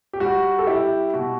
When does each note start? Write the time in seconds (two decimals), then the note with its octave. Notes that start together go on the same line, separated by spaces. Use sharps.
0.13 G4
0.20 G3 F#4
0.59 A4
0.67 G3 E4 G4
1.13 B2 F#4